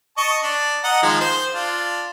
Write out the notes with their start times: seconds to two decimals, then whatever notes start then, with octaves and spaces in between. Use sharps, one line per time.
0.18 D#5 A5 C#6
0.43 D4
0.84 D#5 F#5 A#5
1.02 D#3 F3 G#3
1.20 C5
1.53 D4 F4